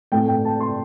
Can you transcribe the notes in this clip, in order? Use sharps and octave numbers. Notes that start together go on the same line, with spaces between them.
A2 A3 C4 G5
G5
A5
C6